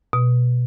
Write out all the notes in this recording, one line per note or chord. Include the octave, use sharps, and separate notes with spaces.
B2